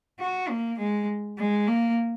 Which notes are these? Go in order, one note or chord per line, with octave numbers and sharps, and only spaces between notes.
F#4
A#3
G#3
G#3
A#3